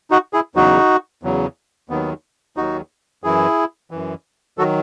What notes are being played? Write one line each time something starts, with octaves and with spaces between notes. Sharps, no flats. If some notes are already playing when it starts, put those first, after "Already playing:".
D#4 F#4
E4 G#4
E2 C#3 F#3 D#4 F#4
E2 C#3 F#3
D#2 D#3 F#3 B3
D#2 D#3 F#3 D#4 F#4
F#2 E3 E4 G#4
F#2 E3
D#3 F#3 F#4 A4